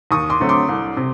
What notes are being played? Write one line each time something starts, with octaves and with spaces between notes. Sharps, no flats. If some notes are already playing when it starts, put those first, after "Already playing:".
D#2 C#6 D#6
C6 D6
D3 F#3 A3 C4
C6 D6
C2
C3